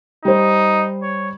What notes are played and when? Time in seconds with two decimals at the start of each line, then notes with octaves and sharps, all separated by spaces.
0.25 G3 D#4 C5
1.02 C#5